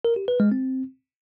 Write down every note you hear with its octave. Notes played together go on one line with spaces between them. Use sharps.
A#4
G4
B4
G#3
C4